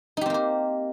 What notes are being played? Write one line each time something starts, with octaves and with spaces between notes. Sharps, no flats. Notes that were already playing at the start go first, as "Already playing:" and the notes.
A#3 C4 D#4 G4 C5